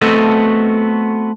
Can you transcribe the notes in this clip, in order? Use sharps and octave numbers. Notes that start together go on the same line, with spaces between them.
A3 B3 C4 F#4 A4 D#5